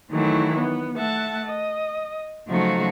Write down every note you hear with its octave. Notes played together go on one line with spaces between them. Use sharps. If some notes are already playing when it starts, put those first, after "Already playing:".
D#3 E3 F#3 A3 E4
B3
A3 E5 F#5 A5
D#5
C#3 F3 F#3 A3 D#4 F#4